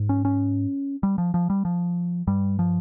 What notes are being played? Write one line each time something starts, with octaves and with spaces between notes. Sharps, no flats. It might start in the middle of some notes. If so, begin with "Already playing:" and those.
Already playing: G#2
C#4
C#4
G3
F3
F3
G3
F3
G2 G3
F3